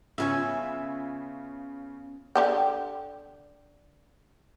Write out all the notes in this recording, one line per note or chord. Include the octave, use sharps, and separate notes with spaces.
C#3 B3 C#4 F4 C#5 E5 G#5
D3 G4 G5